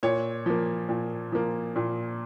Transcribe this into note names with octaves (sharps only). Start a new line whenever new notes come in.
A#2 C#5
F3 A#3
A#2
F3 A#3
A#2